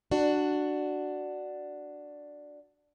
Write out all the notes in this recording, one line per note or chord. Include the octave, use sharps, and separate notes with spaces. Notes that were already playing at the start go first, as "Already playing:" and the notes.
D4 F#4